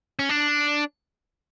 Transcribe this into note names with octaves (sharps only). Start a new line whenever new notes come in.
C#4
D4